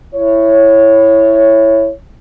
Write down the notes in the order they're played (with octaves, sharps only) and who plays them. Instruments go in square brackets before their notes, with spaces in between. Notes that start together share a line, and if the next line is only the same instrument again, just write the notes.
[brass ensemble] E4 C#5